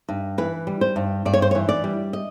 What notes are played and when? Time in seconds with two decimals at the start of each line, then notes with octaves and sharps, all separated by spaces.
0.09 G2
0.38 E3 B4
0.67 G3
0.81 C5
0.96 G2
1.25 G2 D5
1.34 C#5
1.42 C5
1.51 C#5
1.55 E3
1.69 D5
1.84 G3
2.13 D#5